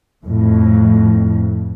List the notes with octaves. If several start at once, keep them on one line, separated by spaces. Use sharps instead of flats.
F2 A2